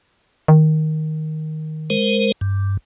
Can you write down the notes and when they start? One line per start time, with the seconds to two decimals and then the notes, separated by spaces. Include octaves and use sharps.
0.48 D#3
1.90 G#3 A#4 C5
2.41 G2